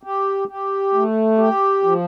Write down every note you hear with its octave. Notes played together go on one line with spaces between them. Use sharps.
G4
G4
A3
G4
F3